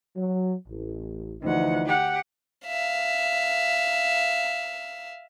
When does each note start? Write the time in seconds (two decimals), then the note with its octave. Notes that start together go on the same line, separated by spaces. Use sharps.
0.17 F#3
0.67 A1
1.42 D2 E3 F3 D#4 F#5
1.85 G4 F#5
2.67 E5 F5